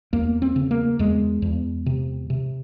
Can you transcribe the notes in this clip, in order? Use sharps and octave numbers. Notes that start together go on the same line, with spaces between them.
E2 A#3
C4
C#3
A#3
E2 G#3
E2
C3
C3